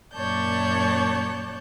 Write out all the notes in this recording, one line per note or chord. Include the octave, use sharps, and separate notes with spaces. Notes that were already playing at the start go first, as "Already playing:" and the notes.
F#2 A#2 C#5 D5 A5 G6